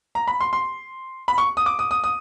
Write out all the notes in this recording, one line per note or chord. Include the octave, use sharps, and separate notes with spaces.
A#5
B5
C6
C6
B5
C#6
D#6
D6
D#6
D#6
D#6